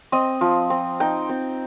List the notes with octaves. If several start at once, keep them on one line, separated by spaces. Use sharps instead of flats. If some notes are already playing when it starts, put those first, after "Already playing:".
C4 D#5
F3
C4
D#4 G5
C4